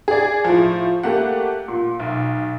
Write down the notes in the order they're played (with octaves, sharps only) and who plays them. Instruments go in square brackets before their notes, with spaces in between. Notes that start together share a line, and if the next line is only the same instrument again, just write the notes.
[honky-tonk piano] G#4 D5
A2 F3
A3 A#3 G4 F#5
A#2
B1